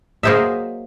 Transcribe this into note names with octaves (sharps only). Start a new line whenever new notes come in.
F#3 A#3 G#4 C5 D#5 E5